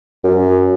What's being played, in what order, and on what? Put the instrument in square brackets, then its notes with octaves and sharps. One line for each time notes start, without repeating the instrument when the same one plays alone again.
[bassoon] F#2